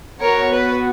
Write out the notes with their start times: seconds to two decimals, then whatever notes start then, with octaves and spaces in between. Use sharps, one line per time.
0.21 B3 F#4 A#4 C#5
0.51 B4